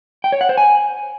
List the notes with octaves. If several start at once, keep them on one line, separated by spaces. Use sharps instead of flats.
G5
C#5
F#5
C5
G#5